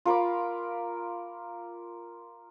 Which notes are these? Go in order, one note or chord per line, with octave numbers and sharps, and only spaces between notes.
F4 A#4 B5 D6